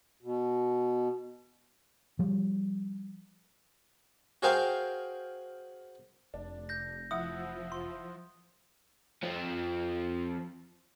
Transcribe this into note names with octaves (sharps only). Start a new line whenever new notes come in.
B2
F3 G3
F#4 G#4 A#4 C5 F5 G5
F1 D4
G6 A#6
F3 E4 F#5 D#6
C6
F3 C4